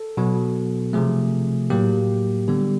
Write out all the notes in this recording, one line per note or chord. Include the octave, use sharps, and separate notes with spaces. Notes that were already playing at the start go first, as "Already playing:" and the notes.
Already playing: A4
B2 F#3 B3
C3 F3 A3 G#4
A2 F#3 A#3 G4
D3 G3 B3